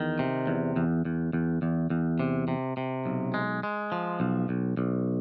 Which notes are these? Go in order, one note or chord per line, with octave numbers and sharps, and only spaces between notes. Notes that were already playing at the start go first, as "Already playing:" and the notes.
Already playing: E2 D#3
C3
E2
E2
E2
E2
E2
E2
C3
C3
C3
B1
G#3
G#3
F3
B1
B1
B1